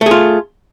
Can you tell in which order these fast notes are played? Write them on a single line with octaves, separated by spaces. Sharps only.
A3 G#4 F4